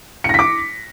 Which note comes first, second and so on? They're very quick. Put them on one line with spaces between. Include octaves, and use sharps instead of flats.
C#7 A#6 B6 D6